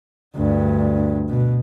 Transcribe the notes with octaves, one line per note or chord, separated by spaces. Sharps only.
D2 G2
B2